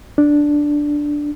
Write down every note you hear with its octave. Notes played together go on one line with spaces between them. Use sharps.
D4